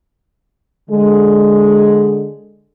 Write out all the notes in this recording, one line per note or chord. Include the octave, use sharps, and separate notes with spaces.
D3 G#3